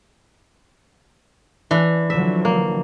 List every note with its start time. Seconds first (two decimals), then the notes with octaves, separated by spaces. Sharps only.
1.71 E3 D4
2.10 D3 F3 F#3 E5
2.45 A#3